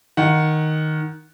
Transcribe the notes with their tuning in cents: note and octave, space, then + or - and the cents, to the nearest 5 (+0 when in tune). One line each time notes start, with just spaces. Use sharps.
D#3 +0 F#5 +0